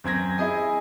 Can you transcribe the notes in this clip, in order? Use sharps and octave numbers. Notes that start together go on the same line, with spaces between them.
F#2 C4 G#6 A#6
E4 G#4 D#5 G#5